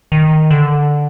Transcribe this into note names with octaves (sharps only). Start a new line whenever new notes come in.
D#3
D3